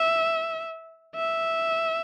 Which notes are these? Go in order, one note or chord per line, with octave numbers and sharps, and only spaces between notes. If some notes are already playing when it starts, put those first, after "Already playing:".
Already playing: E5
E5